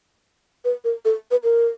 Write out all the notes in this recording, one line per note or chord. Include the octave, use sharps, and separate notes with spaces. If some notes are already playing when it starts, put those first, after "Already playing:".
B4
A#4
A4
B4
A#4